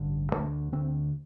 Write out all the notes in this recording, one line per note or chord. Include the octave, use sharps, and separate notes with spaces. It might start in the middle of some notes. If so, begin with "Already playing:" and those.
Already playing: A1 G2 D3
D2 D3 A3
D2 D3 C4